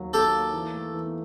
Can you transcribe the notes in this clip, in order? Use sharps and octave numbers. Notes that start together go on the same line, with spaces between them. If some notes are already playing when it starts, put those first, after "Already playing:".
Already playing: D#2 F#3
D#2 G4 A4
A#3
E3
A3
E3